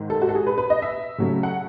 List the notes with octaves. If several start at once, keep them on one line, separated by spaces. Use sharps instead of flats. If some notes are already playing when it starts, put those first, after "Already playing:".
Already playing: G#2 D#3
A4
F#4
A4
G#4
B4
B4
D#5
E5
C#3 F#3 A3 C#4
F#5